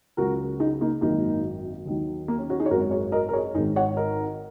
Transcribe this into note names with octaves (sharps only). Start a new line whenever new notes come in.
C#2 C#3 F#3 F#4 A#4
D#4 G#4
A#3 D#4
G#1 F#2 D#3 F#3 A#3 D#4
D#2 D#3 F#3
A#3
C#4
C#4 F#4
D#4 G#4
C#5
G#1 F#2 D#3 F#3 F#4 A#4
G#4 C#5
A#4 D#5
A#4
G#4 C#5
G#1 G#2 D#3 D#4 G#4
C#5 F#5
A#4 D#5